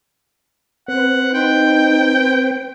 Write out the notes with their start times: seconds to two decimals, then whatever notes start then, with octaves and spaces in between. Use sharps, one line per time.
0.88 C4 B4 C5 F#5
1.34 D#4 G5